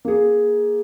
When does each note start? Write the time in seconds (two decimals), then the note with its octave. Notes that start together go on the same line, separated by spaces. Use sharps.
0.05 A#3 G#4